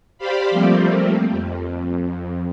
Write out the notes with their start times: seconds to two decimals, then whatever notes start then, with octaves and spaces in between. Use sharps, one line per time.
0.18 G4 C5 D5 F5 B5
0.51 F3 G3 A3 A#3 C4
1.31 F2